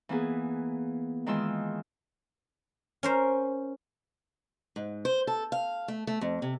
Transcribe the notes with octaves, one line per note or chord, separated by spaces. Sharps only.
E3 A#3 B3 G#4
D#3 E3 G#3 F4 C6 E6
C#4 A#4 C5
G#2
C5
A4
F5
A3
A3
F2
C3